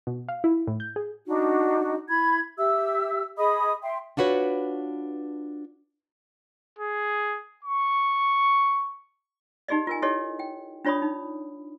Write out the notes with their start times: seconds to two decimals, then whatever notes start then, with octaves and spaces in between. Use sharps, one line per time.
0.07 B2
0.28 F5
0.44 E4
0.67 A2
0.80 G6
0.96 G#4
1.27 D4 D#4 F#4
2.08 E4 B5 G#6
2.57 G4 E5 E6
3.37 G#4 D#5 B5 D#6
3.82 E5 G5 C6
4.17 D4 F4 F#4 B4 C#5
6.79 G#4
7.65 C#6
9.68 D#4 G4 G#4 D5 D#5
9.87 F4 A#4 G#5
10.02 E4 G4 A4 C#5 D#5
10.39 G5
10.85 D4 F4 C#5 D5 B5 D#6
11.02 D#4